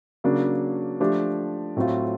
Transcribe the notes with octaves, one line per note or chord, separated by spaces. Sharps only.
C#3 F#3 A#3 D4
F3 A3 D4 G4
A2 F#3 A3 C4 F4